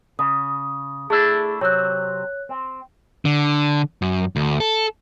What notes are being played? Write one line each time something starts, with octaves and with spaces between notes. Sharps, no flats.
C#3 D#6
A3 D4 E4 G#4
C3 F#3 C4 C#5 F#6
C4
D3
F#2
D2
A4